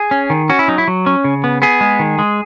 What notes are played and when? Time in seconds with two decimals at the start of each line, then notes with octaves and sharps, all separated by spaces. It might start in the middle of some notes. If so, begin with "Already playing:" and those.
Already playing: G#4
0.11 C#4
0.30 D#3
0.50 C#4 F#4
0.59 E4
0.68 F#3 D#4
0.78 E4
0.88 F#3
1.06 C#4
1.24 C#3
1.44 B3
1.62 B3 G#4
1.81 G#3
1.99 D#3
2.19 G#3